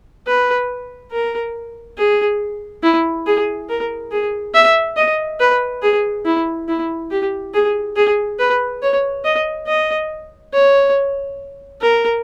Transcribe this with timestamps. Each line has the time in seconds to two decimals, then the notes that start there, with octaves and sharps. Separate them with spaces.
0.27 B4
1.12 A#4
1.97 G#4
2.83 E4
3.26 G#4
3.69 A#4
4.11 G#4
4.54 E5
4.97 D#5
5.40 B4
5.82 G#4
6.25 E4
6.68 E4
7.11 G4
7.54 G#4
7.96 G#4
8.39 B4
8.82 C#5
9.24 D#5
9.67 D#5
10.53 C#5
11.81 A#4